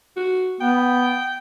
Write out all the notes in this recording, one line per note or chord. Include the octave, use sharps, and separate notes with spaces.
F#4
B3 G5